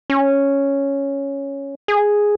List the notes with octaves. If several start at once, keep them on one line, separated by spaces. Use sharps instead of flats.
C#4
G#4